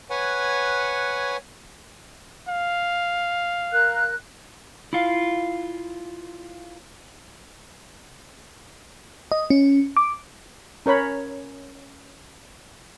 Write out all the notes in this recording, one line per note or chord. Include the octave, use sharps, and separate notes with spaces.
B4 C#5 F#5 G#5
F5
A#4 F#6
E4 F4 F5
D#5
C#4
D6
C#4 A#4 C#5 B5